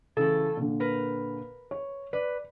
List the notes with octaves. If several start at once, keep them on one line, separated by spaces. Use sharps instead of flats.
A2 C#3 E3 A4
A#2 D3
A#4 B4
C#5
B4 D5